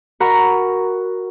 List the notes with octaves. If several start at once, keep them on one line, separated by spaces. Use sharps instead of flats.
F#4 A#4 F#5 A#5 B5